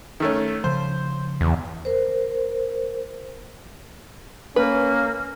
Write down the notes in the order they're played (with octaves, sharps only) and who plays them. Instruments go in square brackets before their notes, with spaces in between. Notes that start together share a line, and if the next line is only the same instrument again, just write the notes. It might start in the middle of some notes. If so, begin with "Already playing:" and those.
[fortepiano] D#3 A3 C#4
[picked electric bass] C#3 F3 [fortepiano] C5
[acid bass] E2
[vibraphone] A#4 C5
[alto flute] A#3 [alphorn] C#4 [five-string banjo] B4